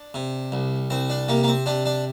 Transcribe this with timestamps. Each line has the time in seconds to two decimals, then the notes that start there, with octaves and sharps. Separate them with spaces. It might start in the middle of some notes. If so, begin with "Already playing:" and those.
Already playing: D4
0.14 C3
0.52 C2
0.90 C2 C4
1.10 D4
1.28 C3 A#3
1.43 A#3
1.48 C4
1.66 C3 D4
1.86 D4